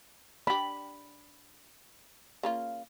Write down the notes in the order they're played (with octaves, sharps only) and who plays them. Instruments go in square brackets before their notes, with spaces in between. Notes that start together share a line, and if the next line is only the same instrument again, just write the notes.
[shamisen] D4 G4 [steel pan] B5
[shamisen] C#3 A#3 F4